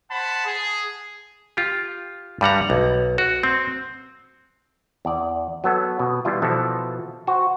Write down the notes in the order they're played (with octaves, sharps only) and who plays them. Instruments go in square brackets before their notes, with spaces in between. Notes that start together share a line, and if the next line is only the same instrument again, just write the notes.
[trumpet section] C5 F#5 A5 B5
G#4
[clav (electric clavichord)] F4 G4
G2 G3 F#5 A#5
B1
F#4
C4
E2 D5
F#3 B3 A4
B2
B2 E3 G3 E4 F4
B2 E3 F3 A4
F#4 C5